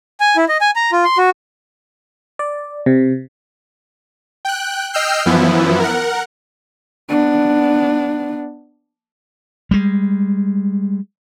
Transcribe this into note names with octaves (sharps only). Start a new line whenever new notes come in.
G#5
E4
D#5
G#5
A#5
F4
C6
F#4
D5
C3
G5 F#6
D#5 G5 E6 F6 G6 C7
F#2 E3 F3 B3 E4
A#4 F#5
B3 D4
G3 G#3